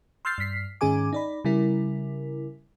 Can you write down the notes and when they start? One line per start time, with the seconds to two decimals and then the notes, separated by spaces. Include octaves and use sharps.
0.25 C6 E6 F6 G6 A6 C7
0.38 G2 F6 B6 C7
0.81 G#2 D#3 C#4 G#4 G#5 D6
1.13 D#4 D5 B5
1.45 C#3 G3 E4 A#4